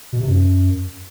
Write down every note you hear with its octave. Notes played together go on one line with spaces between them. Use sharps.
B2
C3
F#2